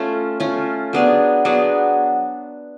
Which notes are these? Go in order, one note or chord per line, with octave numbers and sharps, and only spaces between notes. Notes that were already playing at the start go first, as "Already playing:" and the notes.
Already playing: A3 C#4 F4
A3 C#4 F4
F#3 B3 D4 G#4
F#3 B3 D4 G#4